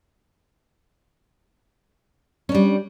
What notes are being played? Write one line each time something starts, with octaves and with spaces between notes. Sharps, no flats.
G3 C#4 D4